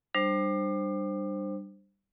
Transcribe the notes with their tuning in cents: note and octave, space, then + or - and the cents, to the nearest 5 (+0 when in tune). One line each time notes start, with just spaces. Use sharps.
G3 +0 D4 +35 C5 +5